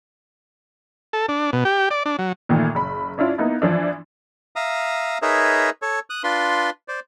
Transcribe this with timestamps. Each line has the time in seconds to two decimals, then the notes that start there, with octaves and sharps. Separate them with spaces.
1.13 A4
1.29 D4
1.53 B2
1.65 G4
1.91 D5
2.06 D4
2.19 F#3
2.49 A#2 D#3 E3 A3
2.75 F#1 B5
3.18 C#4 D4 E4 F4
3.38 A#3 B3 D#4 E4
3.62 E3 F3 D4
4.56 E5 F5 A#5 D#6
5.22 D#4 G#4 A#4 B4 C#5 E5
5.82 A4 C#5
6.10 D#6 F#6
6.24 D4 F4 B4 C6
6.88 C5 D5